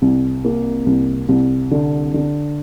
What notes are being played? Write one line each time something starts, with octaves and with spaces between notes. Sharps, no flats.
C2
A#3
C2
C2
D3
D3